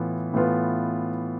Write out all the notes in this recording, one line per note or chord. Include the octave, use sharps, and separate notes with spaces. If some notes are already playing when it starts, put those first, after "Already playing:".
Already playing: A2 E3 B3 F4
A2 E3 B3 F4 B4